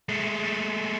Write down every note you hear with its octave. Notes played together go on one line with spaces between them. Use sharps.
G#3 A3